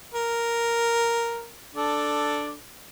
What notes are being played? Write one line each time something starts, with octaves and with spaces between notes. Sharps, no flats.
A#4
D4 A4